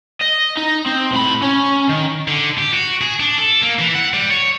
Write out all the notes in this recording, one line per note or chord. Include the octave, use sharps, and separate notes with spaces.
D#5
D#4
C4
A2 B5
C#4
D#3
D3
G4
F#4
G#4
D4
A4
A#3
E3
F#5
G3
C#5